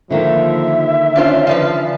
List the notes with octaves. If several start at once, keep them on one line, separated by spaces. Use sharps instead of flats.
D3 D#3 F3 A#3 E5
C#4 D4 F4 C5
C#3 F3 D4 B4